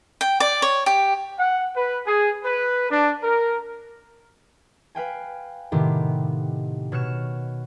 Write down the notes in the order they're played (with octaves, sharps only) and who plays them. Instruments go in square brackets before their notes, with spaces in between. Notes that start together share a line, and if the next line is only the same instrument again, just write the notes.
[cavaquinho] G5
D5
C#5
G4
[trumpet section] F#5
B4
G#4
B4
D4
A#4
[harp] B4 F5 G5 G#5
A2 C3 D#3 B3 G4
B2 C#5 F6 F#6 C#7 E7